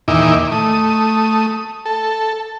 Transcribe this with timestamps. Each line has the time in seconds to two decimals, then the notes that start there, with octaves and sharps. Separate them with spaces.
0.08 E2 A#2 D#3 D#4 E4 D6
0.52 A3 D#6
1.86 A4